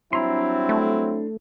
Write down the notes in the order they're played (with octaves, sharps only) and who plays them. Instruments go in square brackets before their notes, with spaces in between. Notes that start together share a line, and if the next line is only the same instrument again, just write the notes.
[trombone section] F#3 G3 C4 [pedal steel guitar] D4 A#5 C6 [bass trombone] E4
[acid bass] A3